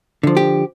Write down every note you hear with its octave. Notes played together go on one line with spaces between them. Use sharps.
D3 F3
G4